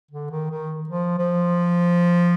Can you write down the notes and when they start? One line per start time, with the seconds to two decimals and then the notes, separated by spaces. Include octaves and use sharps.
0.11 D3
0.31 D#3
0.51 D#3
0.89 F3
1.18 F3